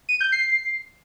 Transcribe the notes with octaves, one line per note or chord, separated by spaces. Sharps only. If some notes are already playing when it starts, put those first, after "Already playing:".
D#7
G6
C7